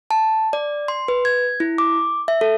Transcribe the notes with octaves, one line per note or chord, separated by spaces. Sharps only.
A5
D5
C6
B4
G#6
E4
D6
E5
A4